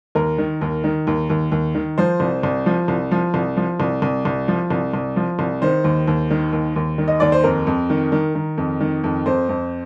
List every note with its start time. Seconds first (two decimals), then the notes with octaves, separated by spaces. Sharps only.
0.15 D#2 A#4
0.38 D#3
0.61 D#2
0.84 D#3
1.07 D#2
1.30 D#2
1.52 D#2
1.75 D#3
1.98 F3 C5
2.20 C2
2.43 C2
2.66 F3
2.88 C2
3.11 F3
3.34 C2
3.57 F3
3.80 C2
4.02 C2
4.25 C2
4.48 F3
4.70 C2
4.94 C2
5.16 F3
5.39 C2
5.62 D#3 C5
5.84 D#2
6.07 D#2
6.31 D#3
6.53 D#2
6.76 D#2
6.98 D#3
7.08 D#5
7.20 D#2 D5
7.32 C5
7.44 F2 A#4
7.67 F2
7.90 D#3
8.12 D#3
8.35 D#3
8.58 F2
8.80 D#3
9.04 F2
9.26 F2 C5
9.49 F2